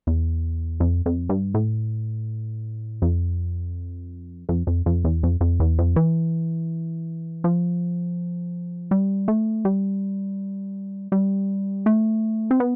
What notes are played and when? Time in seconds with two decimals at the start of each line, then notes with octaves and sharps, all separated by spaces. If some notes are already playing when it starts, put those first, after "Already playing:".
0.07 E2
0.80 F2
1.06 F2
1.29 G2
1.54 A2
3.02 F2
4.49 F2
4.67 F2
4.86 F2
5.05 E2
5.23 F2
5.41 F2
5.60 E2
5.78 F2
5.96 E3
7.44 F3
8.91 G3
9.28 A3
9.65 G3
11.12 G3
11.86 A3
12.51 C4
12.60 B3